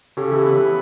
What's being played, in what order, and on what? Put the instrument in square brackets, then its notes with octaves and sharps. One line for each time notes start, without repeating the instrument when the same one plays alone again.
[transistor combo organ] C#3 [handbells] G4 A4
[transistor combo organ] E3
B3
E3